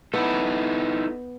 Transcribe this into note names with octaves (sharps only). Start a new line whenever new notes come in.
B3 D#4 E4 A4